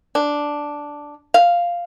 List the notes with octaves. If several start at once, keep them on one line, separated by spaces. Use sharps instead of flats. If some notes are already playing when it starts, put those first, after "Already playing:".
D4
F5